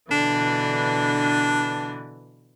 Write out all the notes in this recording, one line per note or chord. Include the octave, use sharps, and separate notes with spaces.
B2 D3 E3 D4